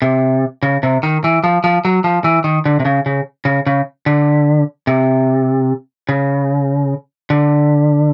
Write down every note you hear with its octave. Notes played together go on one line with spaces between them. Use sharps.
C3
C#3
C3
D#3
E3
F3
F3
F#3
F3
E3
D#3
D3
C3
C#3
C#3
C#3
C#3
D3
C3
C#3
D3